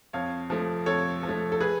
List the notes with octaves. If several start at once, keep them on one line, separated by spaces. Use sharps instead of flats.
F2 C#5 F5
F3 A3
F2 A4 C#5
F3
A3
A4
G#4 B4